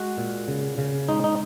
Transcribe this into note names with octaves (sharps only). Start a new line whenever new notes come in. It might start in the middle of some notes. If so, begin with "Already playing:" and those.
Already playing: G#3 F#4
A#2
C#3
C#3
G#3 D#4
D#4